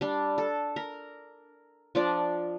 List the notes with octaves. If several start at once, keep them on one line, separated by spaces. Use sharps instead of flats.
G3 D4
A4
A#4
F3 D4 D5